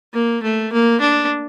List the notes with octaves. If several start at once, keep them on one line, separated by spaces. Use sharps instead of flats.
A#3
A3
A#3
D4